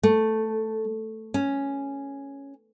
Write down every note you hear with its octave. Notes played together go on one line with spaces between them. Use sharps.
A3
C#4